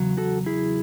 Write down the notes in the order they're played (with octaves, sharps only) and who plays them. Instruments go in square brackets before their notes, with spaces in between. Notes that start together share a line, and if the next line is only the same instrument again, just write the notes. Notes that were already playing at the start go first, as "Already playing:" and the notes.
Already playing: [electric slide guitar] E2 C#3 F#3
F#4 A4
E4 G#4